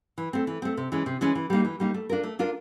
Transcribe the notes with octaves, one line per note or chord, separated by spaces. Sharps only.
E3
A3 C4
E3
A3 C4
C3
E3 G#3 C#4
C3
E3 G#3 C#4
E3
G3 A#3 D#4
E3
G3 A#3 D#4
A3
D4 F4 A#4
A3
D4 F4 A#4